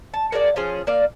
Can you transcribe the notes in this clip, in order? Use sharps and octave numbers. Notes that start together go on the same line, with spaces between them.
A5
A#3 F#4 G#4 D5
F3 C#4 F4 G#4
A#3 D5 F5